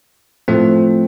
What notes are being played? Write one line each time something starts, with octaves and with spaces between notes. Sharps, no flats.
A2 F3 A3 C4